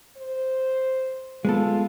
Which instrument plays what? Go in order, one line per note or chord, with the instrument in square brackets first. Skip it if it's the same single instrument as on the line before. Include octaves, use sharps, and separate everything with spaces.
[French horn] C5
[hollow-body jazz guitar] G#3 B3 A4 [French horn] F4